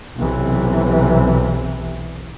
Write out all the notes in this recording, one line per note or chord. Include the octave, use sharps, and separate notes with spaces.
B1 C3 E3